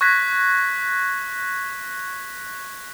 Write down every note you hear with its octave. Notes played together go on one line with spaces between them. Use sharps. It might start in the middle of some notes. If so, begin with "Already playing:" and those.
C#6 F#6 G#6 A#6 B6